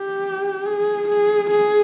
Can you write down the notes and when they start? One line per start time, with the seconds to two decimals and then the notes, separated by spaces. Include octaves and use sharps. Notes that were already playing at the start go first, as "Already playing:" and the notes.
Already playing: G4
0.66 G#4
1.08 G#4
1.51 G#4